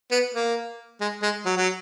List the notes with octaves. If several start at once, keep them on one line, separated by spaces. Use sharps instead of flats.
B3
A#3
G#3
G#3
F#3
F#3